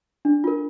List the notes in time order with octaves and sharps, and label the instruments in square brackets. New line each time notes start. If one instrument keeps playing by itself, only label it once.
[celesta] D4
F4 A#4